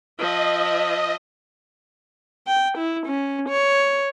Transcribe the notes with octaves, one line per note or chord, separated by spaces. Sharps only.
F3 D#5 E5
G5
E4
C#4
C#5